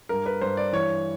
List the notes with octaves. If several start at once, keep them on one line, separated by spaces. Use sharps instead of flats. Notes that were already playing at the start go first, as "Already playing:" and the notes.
G2 A#4
B4
G2 C5
D5
E3 C#5